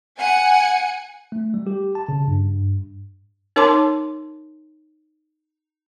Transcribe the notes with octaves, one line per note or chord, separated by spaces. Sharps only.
F#5 G#5 C#7
A3
G3
G4
A5
C#3
G2
D#4 A#4 C#5 A5 C6 D6